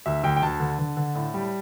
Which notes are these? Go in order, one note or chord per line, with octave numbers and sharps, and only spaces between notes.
D2 E5
D2 G5
G5
D2 A5
D3
D3
D3
A2
G3